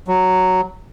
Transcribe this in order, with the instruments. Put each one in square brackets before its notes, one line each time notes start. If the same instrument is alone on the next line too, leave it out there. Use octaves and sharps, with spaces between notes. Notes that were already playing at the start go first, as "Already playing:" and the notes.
[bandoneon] F#3